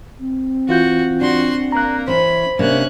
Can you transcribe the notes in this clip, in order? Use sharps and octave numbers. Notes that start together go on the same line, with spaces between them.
C4
E3 F4 F#4 G6
D4 F#4 C6
A#3 A#5 F#6
E3 C#4 C5 B5
C3 A#3 C#4 D4 F#6